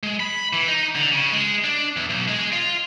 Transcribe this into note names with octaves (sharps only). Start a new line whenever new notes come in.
G#3
B5
E3
D#4
D3
C#3
G#3
D4
E2
B1
G#3
F4